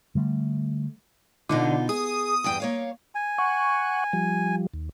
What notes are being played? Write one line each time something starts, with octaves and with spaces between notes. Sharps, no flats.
D3 G3 A3
B2 D3 D#4 F4
G#4 D#6
E2 G2 G5
A#3 C#5 F5
G#5
F#5 C#6
F3 G3
D#2